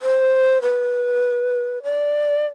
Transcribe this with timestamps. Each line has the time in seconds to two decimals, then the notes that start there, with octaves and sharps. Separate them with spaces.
0.01 C5
0.61 B4
1.83 D5